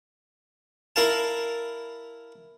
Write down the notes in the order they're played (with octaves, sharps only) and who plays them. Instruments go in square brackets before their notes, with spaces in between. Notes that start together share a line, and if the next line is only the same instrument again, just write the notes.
[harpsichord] E4 A#4 F5 A5